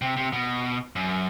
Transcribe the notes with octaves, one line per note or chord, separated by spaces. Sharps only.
C3
C3
B2
F#2